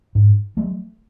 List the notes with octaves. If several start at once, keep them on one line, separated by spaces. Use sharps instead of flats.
G#2
F#3 A3